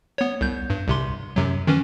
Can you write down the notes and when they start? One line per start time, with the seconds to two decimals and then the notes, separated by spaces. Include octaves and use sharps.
0.18 B3 C#5
0.41 C2 G6
0.70 G2
0.88 C2 C3 C6
1.36 F#2 C3 F#3
1.67 D#3 E3 C#4